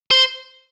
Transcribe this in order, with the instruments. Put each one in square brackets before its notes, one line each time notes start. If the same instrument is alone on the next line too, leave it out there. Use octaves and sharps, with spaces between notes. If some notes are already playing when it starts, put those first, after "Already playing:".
[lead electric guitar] C5